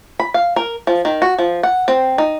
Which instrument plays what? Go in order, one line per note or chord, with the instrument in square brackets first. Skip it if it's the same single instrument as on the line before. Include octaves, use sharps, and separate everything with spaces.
[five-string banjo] B5
F5
A#4
F3
D#3
F#4
F3
F#5
C4
D#4